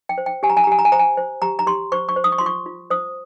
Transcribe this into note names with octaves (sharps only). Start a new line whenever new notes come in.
G5
C5
G5
G4 G#5
A#5
G#5
A#5
G4 G#5
A#5
G#5
C5 A#5
G#5
C5
G4 A#5
A#5
G4 C6
C5 C#6
C#6
C5
D#6
C#6
F4 C6
C#6
F4
C5 D#6